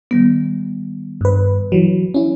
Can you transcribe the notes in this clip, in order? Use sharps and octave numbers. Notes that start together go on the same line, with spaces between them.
D#3 G3 B3
G2 B4
E3 F#3
C#4 E4